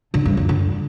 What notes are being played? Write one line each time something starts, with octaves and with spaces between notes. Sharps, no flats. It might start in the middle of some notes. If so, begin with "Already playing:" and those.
D3
G2
F#2
D3